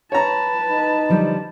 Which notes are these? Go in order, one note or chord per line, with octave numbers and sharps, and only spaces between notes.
B4 C#5 A5 A#5
D#4
D3 F3 G3